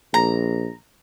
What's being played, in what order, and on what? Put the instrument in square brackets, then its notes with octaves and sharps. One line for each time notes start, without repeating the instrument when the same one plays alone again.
[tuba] A#1 [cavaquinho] A#5